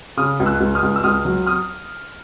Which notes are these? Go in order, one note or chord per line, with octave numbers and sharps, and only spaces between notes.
C#3 D#6 F6
C#2
E6 F#6
C#2
D#6 F6
C#2
E6
C#2 D#6 F6
F#3
D#6 F6